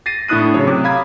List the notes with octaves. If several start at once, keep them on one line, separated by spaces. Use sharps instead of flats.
A6 A#6 C7 D#7
A2 D4 E4 D#6 F#6 D#7
A2 C#3 F#3 C#5
C3 D6
F5 A#5 B5 D#6 G#6